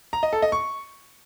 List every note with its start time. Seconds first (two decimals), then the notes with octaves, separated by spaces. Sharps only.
0.13 A#5
0.23 D#5
0.33 A4
0.42 D#5
0.52 C#6